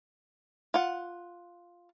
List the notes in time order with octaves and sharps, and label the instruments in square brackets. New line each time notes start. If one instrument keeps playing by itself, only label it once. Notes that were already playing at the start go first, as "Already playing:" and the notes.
[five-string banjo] F4 F#5